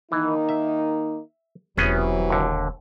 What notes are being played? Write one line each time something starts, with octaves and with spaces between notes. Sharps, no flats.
D#3 E3 A#3 D#4
E5
E1 C3 E3 F#3 B3 C#4 G#4
D#2 D3